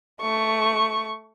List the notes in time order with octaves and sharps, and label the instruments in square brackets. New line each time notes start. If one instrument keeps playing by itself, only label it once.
[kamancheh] A3 C#6